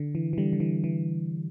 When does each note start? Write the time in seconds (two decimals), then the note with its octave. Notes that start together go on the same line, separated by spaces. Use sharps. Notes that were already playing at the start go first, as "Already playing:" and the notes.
Already playing: D3
0.15 E3
0.33 E3
0.38 D3 G3
0.53 D3
0.60 E3
0.84 E3